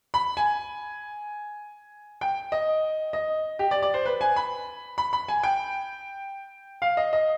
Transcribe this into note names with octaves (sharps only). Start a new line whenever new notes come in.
B5
G#5
G5
D#5
D#5
G4
D5
D5
C5
B4
G#5
B5
B5
B5
G#5
G5
F5
D#5
D#5